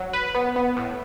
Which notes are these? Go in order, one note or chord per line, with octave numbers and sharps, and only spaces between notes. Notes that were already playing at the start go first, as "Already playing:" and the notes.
Already playing: F#3
B4
B3
B3
A2